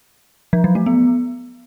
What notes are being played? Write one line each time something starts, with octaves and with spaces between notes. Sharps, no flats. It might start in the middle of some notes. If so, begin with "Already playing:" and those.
F3
F#3
A3
B3